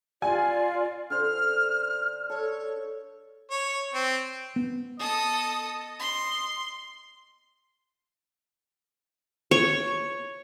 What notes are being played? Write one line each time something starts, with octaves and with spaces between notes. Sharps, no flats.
F4 D5 G#5
D3 C5 F6
A4 C#5
C#5
C4
B3
A4 D#5 D#6
C6
C#5